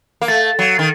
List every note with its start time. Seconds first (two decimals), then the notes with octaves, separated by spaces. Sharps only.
0.22 A#3
0.28 A3 A6
0.59 F#3
0.79 D#3